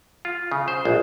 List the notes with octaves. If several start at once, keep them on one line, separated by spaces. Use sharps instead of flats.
F4
C#3
C5
A#1